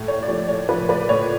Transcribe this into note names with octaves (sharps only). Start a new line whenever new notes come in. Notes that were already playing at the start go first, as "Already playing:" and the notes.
Already playing: A2
C#5
D5
F3 C#5
C#5
F3 B4 D5
B4 D5
A2 C#5